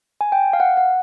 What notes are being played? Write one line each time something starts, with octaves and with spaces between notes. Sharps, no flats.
G#5
G5
F5
F#5
F#5